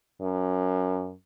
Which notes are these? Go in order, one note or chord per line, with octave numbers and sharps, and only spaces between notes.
F#2